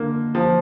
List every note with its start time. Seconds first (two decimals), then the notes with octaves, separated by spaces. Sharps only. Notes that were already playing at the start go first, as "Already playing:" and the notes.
Already playing: D3 A#3
0.35 F3